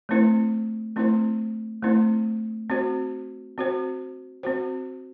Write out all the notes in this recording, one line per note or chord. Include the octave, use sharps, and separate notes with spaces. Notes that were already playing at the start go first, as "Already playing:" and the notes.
A3 C4 E4 C5
A3 C4 E4 C5
A3 C4 E4 C5
C4 F#4 C5
C4 F#4 C5
C4 F#4 C5